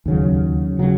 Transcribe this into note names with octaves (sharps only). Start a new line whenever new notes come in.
D#2 C#3 F#3
C#3 F#3